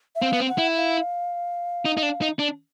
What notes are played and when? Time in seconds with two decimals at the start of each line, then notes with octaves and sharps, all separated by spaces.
0.16 E5
0.21 C4 F5
0.33 B3
0.40 C4
0.48 F#5
0.58 E4
0.77 F5
1.85 D#4
1.97 D#4
2.03 D4
2.22 D#4
2.39 D4